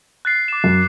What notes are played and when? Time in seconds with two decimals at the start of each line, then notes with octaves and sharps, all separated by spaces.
0.25 F#6 A6 C7
0.48 D6 E7
0.64 F#2